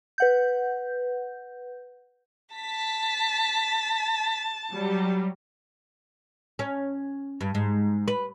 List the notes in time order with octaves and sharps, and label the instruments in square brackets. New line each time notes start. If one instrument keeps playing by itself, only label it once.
[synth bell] B4 F#5 G6
[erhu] A5 [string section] B6
[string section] F#3 G3
[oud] C#4
G2
G#2
B4